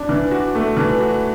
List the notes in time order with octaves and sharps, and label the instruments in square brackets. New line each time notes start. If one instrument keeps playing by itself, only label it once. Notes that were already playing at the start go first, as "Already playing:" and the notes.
Already playing: [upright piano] D4
E3
F#4
A3
E3
F#4